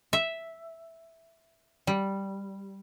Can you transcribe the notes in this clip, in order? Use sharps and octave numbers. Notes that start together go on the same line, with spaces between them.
E5
G3